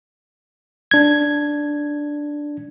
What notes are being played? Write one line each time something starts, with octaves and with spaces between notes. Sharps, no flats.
D4 G#6